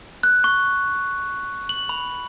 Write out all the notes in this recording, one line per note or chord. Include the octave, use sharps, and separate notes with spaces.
F#6
C#6
F#7
B5